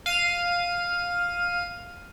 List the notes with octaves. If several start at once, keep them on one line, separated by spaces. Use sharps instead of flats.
F5 D#7